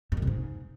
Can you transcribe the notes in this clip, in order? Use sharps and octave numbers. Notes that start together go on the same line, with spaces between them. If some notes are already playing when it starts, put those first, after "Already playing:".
G2
F#2
C3
G#2